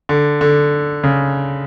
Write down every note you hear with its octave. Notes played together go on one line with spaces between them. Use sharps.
D3
D3
C#3